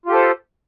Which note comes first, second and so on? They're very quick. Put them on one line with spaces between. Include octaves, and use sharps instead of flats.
F4 G4 A4 C5